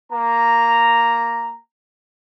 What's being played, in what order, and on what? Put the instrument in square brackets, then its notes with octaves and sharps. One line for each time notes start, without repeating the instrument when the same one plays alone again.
[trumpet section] A#3 A#5